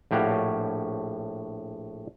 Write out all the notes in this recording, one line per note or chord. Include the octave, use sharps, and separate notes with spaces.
A#1 A2 G4 C#5 F5 F#5